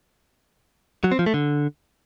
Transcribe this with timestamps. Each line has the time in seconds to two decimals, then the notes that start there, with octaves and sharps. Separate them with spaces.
1.04 F#3
1.12 C4
1.19 F3
1.26 A3
1.34 D3